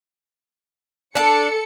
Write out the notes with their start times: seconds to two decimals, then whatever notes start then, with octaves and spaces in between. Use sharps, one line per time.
1.15 D4 A4 A5 C#7